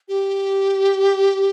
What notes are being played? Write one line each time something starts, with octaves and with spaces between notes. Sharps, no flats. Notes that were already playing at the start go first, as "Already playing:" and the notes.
G4